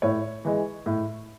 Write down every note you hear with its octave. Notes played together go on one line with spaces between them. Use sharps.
A2 C#5
E3 G#3
A2